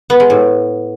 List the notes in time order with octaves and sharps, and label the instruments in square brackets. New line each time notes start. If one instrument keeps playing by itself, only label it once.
[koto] B3
G#3
A2